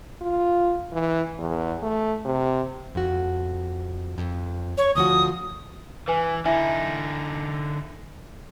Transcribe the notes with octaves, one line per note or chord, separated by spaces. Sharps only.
F4
E3
E2
A3
C3
F2 F#4
F2
C#5
D2 F3 F#4 D#6
E3 B4 G#5
D3 D#4 E4 E5 G#5